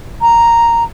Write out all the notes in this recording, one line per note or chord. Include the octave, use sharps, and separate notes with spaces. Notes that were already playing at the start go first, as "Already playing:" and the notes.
A#5